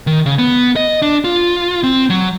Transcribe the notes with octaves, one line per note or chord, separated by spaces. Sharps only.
D#3
C#3
B3
D#5
D4
F4
C4
F#3